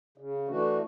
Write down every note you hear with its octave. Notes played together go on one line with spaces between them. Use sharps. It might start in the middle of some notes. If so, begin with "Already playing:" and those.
C#3
E3 A3 D4 F#4